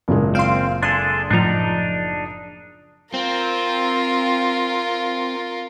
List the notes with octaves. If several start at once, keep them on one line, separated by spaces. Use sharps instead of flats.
F#1 A#2 G#3
C4 F5 C6
D4 G#4 A4 C6
A2 F3 D4 D#4 A#5
C4 F4 A#4